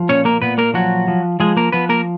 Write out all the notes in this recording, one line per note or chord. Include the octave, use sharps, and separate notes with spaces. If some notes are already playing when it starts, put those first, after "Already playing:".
Already playing: F3
A#2 C#4 C#5
A#3 A#4
A#2 B3 B4
A#3 A#4
F3 F#3 F#4
F3
F3 G#3 G#4
A#3 A#4
F3 B3 B4
A#3 A#4